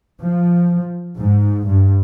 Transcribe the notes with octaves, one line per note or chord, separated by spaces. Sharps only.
F3
G#2
G2